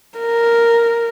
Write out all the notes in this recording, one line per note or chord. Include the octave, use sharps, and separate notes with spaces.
A#4